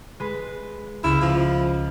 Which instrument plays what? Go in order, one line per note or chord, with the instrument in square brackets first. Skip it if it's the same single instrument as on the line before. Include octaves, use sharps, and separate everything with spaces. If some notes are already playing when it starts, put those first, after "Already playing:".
[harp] G#3 B4
[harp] C#2 [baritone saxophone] E4
[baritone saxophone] F3